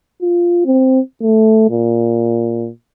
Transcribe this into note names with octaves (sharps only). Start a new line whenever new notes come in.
F4
C4
A3
A#2